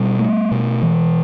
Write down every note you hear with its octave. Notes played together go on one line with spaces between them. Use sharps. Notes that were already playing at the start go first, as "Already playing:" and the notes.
Already playing: B2 G3
A3
B2
E3